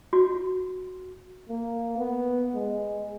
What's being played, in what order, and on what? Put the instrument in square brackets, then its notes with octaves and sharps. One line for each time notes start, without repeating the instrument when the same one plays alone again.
[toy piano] F#4
[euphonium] A#3
B3
G#3